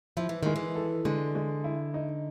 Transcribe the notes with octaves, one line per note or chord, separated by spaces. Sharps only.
F3 E4
E3
D#3 G#3
E3
A4
D3 G#3
G#3
E4
D#4